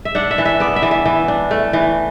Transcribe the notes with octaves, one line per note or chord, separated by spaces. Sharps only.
E5
D4 F#5
E5
E3
E5
B3 D5
E5
E3
E5
E3
D4
A3
E3